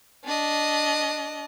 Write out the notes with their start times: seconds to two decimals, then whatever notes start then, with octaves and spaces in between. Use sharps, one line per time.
0.25 D4 D#5